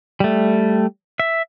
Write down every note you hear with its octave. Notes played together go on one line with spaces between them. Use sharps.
G3 A3
E5